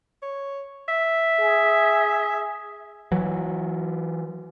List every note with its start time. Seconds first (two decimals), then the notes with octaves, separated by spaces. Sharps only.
0.23 C#5
0.88 E5
1.40 G#4
3.12 E3 F#3